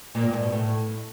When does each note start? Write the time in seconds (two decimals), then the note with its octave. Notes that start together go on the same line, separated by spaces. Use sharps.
0.15 A#2
0.24 G2
0.34 G#2
0.43 B2
0.52 A2